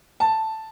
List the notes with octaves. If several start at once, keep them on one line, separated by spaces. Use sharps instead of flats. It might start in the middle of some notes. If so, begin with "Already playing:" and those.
A5